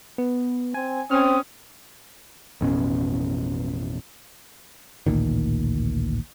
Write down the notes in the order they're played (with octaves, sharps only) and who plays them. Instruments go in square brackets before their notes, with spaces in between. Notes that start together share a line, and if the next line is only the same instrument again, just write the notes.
[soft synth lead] B3
[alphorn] C4 [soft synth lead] G#5
[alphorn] C4 [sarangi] C#4 [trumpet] D#6 [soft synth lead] F6
[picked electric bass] A1 F2 B2 C#4
A1 D2 A#2 D#3